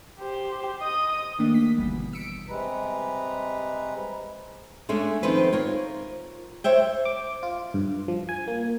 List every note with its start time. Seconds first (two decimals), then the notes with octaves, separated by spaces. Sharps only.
0.20 G4 C5
0.81 D#5 D#6
1.39 D#3 A3 A#3 D4 G4
1.54 B6
1.78 G1 D2 B2 E3 G3
2.13 E6 B6 C#7 D7
2.49 C3 G3 G#3 B4 A#5
4.89 G#3 A3 C#4 D4
5.23 D#3 F3 A3 C4 B4
5.53 F4 A#4 C#5
6.64 C5 C#5 E5 G5
7.05 D6
7.43 F4
7.74 G2
8.08 F3
8.29 G#5
8.47 A#3